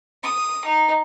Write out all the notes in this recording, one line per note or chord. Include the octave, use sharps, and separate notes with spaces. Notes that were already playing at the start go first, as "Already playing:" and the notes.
D#6
D#4